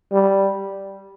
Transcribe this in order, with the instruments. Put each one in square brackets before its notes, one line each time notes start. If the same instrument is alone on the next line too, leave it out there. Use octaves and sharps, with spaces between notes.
[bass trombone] G3